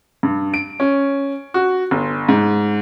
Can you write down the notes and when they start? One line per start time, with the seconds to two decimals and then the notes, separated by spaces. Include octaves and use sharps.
0.23 G2
0.54 D7
0.80 C#4
1.54 F#4
1.91 G1
2.29 G#2